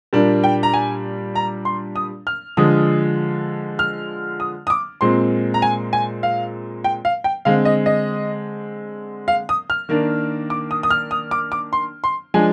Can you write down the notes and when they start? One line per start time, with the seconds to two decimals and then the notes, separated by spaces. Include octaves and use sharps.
0.13 A#2 G3 A#3 D4
0.44 G5
0.63 A#5
0.74 G#5
1.35 A#5
1.65 C6
1.96 D#6
2.27 F6
2.57 D3 F3 G#3 D#6
3.79 F6
4.40 D#6
4.67 D#6
4.70 D6
5.01 A#2 G#3 C4 C6
5.54 A#5
5.62 G#5
5.93 G#5
6.23 F5
6.84 G5
7.05 F5
7.24 G5
7.45 D3 G#3 C4 F5
7.65 D#5
7.86 D#5
9.28 F5
9.49 D#6
9.70 F6
9.89 D#3 A#3 D4
10.50 D6
10.71 D#6
10.83 D#6
10.91 F6
11.11 D#6
11.31 D6
11.52 D6
11.73 C6
12.04 C6
12.34 F3 G#3 D4 G#5